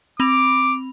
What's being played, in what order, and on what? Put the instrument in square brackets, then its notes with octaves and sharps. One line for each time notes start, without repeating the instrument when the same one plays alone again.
[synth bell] C4 B5 F7 [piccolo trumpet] D6